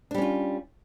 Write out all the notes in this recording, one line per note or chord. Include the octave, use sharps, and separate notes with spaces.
G3 C#4 D4 F4